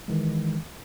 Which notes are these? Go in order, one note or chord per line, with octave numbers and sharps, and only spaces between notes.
D#3 E3 G#3